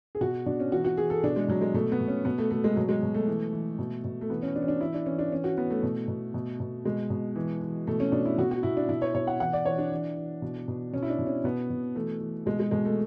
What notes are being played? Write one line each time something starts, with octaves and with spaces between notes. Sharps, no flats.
G#4
B2 F#4
B2 D4
C#4
E3 F#4
F#4
E3 G#4
A4
B2 D4
G#3
B2 F#3
G#3
B2 A3
B3
B2
C#4
B2 B3
A3
B2 A3
G#3
B2 F#3
G#3
B2
A3
E3
E3
B2
B2
A3
E3 B3
C#4
E3 D4
C#4
D4
E3 E4
D4
E3 C#4
D4
E3 C#4
F#4
E3 B3
A3
B2
B2
B2
B2
B2 G#3
B2
E3
E3
B2 A3
C#4
B2 D4
E4
B2 F#4
F#4
B2 E4
D4
B2 E4
C#5
B2 C#5
F#5
E3 F#5
D5
E3 C#5
D4
E3
E3
B2
B2
B2 C#4
E4
D4
B2
C#4
B2 B3
B2
E3 A3
E3
B2 G#3
G#3
B2 G#3
A3